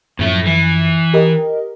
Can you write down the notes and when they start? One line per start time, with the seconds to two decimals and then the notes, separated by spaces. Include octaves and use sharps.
0.19 F#2 A2 F3 A3
0.46 E3
1.14 G4 A#4 D#5